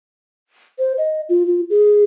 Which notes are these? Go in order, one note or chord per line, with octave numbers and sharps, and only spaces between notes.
C5
D#5
F4
F4
G#4